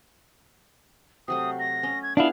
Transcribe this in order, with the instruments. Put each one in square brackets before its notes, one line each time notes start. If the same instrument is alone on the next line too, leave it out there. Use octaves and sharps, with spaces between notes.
[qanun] C3 F#3 A3 [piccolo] D#6
[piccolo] A#6
[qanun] C#4 D#5
[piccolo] G#6
[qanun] B3 F4 G#4 [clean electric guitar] D4 E4 [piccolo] F5